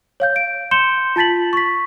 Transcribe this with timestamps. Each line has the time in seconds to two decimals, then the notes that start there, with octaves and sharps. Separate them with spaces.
0.20 C#5 F5 G6
0.36 D7
0.71 C6 G6 C#7 E7 G7
1.16 F4 A5 A6 B6 F#7
1.53 C#6 B6